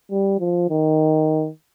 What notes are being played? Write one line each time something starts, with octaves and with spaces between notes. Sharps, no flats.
G3
F3
D#3